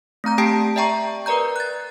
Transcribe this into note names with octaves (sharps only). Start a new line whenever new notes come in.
A3 C4 A#5 G6
A3 G4 G5 A5 B6 D7
D5 E5 G5 A#5 C#6
A#4 B4 D5 A#5 G6
F#6 A6